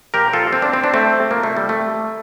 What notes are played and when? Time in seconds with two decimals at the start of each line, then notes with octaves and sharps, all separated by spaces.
0.14 A#2 F3 G4 A#4
0.33 F4 A4
0.53 C4
0.62 D4
0.73 C4
0.84 D4
0.94 A3 C4
1.30 C3 F3 A#3
1.43 A3
1.57 G3
1.69 A3